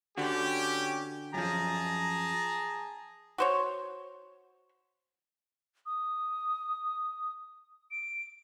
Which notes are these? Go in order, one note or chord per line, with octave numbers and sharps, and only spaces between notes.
D3 C#4 F#4 G4
F#2 F3 G#4 A5 A#5
F#4 C5 C#5
D#6
D7